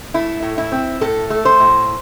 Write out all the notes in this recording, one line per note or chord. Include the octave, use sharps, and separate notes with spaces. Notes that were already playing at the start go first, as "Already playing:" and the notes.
A3 E4
A2
E4
C4
A2 A4
A3
C5
A2